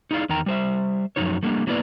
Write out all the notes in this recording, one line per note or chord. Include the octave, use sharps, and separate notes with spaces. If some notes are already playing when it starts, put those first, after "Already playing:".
D#4 E4 G#4 D5 F5
E2 D#3 G5 A#5
G3 C5 E5
F#2 B2 F3 F#3 D#4 C#5
G3 A3 A#3 D4 F#4 G4
F#3 A#3 B3 E4 B4 D5